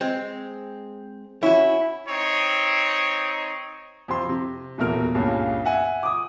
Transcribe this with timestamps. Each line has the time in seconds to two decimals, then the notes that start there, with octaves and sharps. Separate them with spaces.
0.01 G#3 C4
1.43 C#4 E4 F#4
2.09 C4 D#4 C#5
4.08 F2 C3 C6
4.29 C3
4.78 D#1 B1 E2 A3 A#4 F6
5.14 C#2 G2 A#2 C#3
5.65 E5 F#5 G#5
6.03 D6 D#6